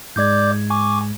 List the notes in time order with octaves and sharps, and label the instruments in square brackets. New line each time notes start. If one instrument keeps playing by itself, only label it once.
[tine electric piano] G#2 G#3 G#6 [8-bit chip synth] D5 D6 G6
[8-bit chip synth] G#5 C#6 D6